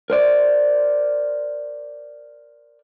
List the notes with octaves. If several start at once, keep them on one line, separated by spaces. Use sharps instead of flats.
A#4 C5 D5